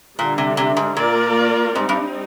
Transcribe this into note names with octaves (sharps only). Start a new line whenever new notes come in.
A#2 D3 G3 D4
C3
C3
G#2
A#2 A#3 F4 A#4 D5
G#2 G3 C4 D#4
G2